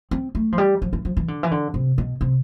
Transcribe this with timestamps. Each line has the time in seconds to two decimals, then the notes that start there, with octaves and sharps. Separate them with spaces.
0.11 C4
0.35 A3
0.52 F3
0.58 G3
0.82 F3
0.93 E3
1.05 F3
1.17 E3
1.28 D3
1.43 E3
1.51 D3
1.74 C3
1.98 B2
2.21 C3